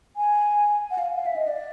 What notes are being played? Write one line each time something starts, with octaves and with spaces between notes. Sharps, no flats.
G#5
F#5
F5
F5
E5
D#5
D5